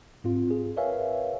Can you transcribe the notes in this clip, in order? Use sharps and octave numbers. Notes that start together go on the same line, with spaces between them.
G#2 C4 F4
G#4
A#4 B4 C#5 E5 F5 G#5